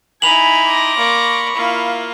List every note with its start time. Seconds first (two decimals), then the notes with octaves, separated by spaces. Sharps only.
0.22 D#4 E4 G#5 B5 F7 F#7
0.64 C6 D6 A#6
0.97 A#3 D5 B5 C#6
1.55 A#3 E4 F4